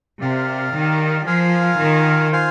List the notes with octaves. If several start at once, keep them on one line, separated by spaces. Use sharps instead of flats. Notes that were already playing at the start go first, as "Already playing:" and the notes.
C3 G4 A#4 D5 F5
D#3
F3 F4 A#4 F5 G#5
D#3
F4 C5 F5 G#5